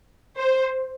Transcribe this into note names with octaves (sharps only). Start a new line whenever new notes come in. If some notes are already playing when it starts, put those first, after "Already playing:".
C5